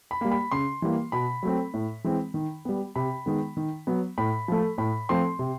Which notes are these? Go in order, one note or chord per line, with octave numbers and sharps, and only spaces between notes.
B5
G3 A#3
B5
C#3 C6
E3 G3 A#3
B2 B5
F#3 A3 C4
A2
E3 G#3 C4
D#3
G3 B3
C3 B5
D#3 G#3 B3
D#3
F#3 B3
A2 B5
F3 A3
A2 B5
F3 A3 C4 C6
C3